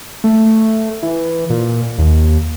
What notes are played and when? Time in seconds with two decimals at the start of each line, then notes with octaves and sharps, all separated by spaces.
0.24 A3
1.03 E3
1.50 A#2
1.98 D#2